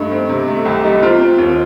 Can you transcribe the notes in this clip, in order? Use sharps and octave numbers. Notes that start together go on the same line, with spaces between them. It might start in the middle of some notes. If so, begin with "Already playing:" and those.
Already playing: G2 A3 D#4
C4
C3
A3
C2 G4
G3 D#4
C4 F4
C4
D#2